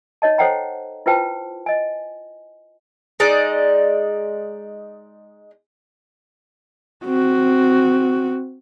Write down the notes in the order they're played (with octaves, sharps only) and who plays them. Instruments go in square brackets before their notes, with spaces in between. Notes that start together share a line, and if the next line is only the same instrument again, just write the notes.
[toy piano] D#4 C#5 D#5 A5
A4 C5 C#5 F#5 G5 A#5
E4 F4 B4 C5 G5 A5
D#5 G#5
[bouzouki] G#3 D#4 D5 D#5
[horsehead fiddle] C4 F#4